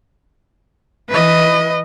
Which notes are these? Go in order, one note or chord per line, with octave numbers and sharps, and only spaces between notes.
E3 B4 D#5